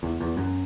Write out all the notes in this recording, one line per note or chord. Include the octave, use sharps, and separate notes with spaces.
E2
E2
F#2